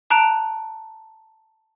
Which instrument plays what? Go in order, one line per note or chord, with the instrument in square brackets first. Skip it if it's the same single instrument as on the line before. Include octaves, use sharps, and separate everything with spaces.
[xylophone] A5 A#5 F#6 D7